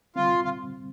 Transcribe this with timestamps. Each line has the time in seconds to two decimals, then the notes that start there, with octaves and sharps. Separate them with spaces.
0.16 D3 G3 C4 F4
0.44 F4